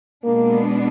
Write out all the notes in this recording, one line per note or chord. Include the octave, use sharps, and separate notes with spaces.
B2 G#3 A#3 B3 D4